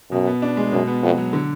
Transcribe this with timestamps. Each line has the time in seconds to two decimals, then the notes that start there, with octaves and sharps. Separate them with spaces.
0.11 F#2 B2
0.27 B3
0.42 D4
0.57 G#3
0.72 F#2 B2
0.87 B3
1.03 F2 F#4
1.18 F#3
1.33 D3